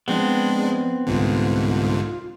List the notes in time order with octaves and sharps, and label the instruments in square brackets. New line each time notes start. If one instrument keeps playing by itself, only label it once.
[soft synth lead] F3 [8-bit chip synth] G#3 D4 [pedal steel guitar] B3 C4
[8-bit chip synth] C2 G#2 D3 [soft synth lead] F4